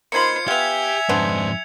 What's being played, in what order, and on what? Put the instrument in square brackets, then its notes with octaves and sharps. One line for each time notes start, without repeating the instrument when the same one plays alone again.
[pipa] A#3 D#4 B5 [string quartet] F4 C5 [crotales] G#6 C#7
[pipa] B3 F5 [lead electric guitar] G4 [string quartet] E5 G#5 [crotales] G#6 F7
[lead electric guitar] F2 G#2 [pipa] B3 D4 C5